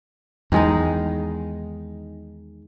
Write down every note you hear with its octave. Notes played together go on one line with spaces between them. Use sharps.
E2 D#3 G#3 D#4